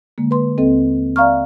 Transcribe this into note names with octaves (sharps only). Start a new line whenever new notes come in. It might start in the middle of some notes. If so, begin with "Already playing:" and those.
D3 G#3 A#3
B4 C6
D#2 C4 A4 D#5
D5 E5 F5 A#5 C#6 F6